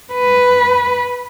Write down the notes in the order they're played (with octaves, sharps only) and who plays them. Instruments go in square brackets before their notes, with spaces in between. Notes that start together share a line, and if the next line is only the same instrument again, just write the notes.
[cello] B4